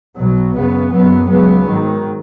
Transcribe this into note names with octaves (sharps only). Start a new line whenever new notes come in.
B1 B2 F#3
F#2 C#3 B3
F#1 F#2 F#3 B3
C#2 C#3 F#3 B3
G#2 D#3 F#3